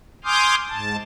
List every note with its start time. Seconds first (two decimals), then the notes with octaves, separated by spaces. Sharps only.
0.24 G#5 C6 D6 D#6 F6 G6
0.70 G#2 A5